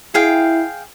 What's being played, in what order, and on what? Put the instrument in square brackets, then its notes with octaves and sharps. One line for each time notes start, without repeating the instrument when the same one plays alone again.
[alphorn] E4 [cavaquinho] G#4 F5 G5